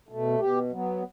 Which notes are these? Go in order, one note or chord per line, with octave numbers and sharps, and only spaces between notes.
B2 A3
B2 G4
F#3 B3